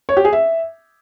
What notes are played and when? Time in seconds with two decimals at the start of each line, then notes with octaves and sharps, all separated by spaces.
0.09 C#5
0.17 G4
0.25 G#4
0.33 E5